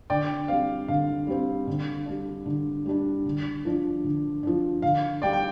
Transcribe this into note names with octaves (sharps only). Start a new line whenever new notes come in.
D3 D5 G5
G3 C4 F5
D3 F5
G3 C4
D3
G3 D4
D3
G3 D4
D3
F3 D4
D3
F3 D4
D3 F5
G3 D4 D5 G5
G5